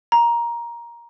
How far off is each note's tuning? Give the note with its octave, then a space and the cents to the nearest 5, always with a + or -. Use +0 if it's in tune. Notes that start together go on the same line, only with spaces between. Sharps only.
A#5 +15